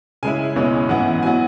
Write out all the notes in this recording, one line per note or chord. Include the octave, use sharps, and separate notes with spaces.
C#3 G#3 C#4 E4 G#5
C#2 B2 G#3 C#4
G#2 E3 B3 E4 F#5
F#3 B3 G#5